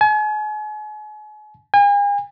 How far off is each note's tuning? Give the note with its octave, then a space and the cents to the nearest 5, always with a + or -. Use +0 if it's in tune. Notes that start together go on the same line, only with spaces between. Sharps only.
G#5 +40
G#5 -40